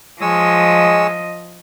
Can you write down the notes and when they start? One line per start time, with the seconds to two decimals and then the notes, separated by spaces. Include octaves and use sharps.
0.21 F3 G#3 C#5 D#5 E6